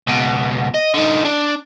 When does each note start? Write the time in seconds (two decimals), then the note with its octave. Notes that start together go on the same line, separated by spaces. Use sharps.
0.07 C#2 B2
0.74 D#5
0.94 D3 D#4
1.25 D4